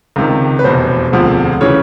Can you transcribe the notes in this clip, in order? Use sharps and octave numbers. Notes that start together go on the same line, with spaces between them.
C#2 C3 D#3
B4
F1 E2 B2 C5
E1 D2 C3 F3
C#3 E3 C#5